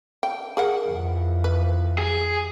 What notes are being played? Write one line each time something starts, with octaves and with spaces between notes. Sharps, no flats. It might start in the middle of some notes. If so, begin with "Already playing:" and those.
G5
G#4 A#4 F#5
F2 E3 F3
B4
G#4